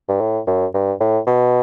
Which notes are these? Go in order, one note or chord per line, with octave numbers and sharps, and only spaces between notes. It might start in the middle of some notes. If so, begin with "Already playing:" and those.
G2
A2
F#2
G2
A2
B2